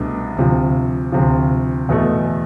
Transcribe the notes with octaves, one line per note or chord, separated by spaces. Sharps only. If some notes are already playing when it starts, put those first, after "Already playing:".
Already playing: C2 B2 A3 D4
D2 C3 F3
D2 C3 F3
E2 B2 A3